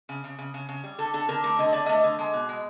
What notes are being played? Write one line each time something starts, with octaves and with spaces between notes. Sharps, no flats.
C#3
C#3
C#3
C#3
C#3
G3
D3 A4
D3 A4
D3 A#4
A3 A#4
D3 D#5
D3 D5
A3 D#5
D3
G#3
B2
G#3